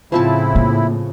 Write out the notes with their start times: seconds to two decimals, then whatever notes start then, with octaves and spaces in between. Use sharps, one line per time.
0.12 A2 C#3 F3 C4 E4 A5
0.55 A#3